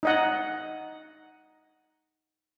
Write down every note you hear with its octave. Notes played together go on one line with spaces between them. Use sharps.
D#4 D#5 F#5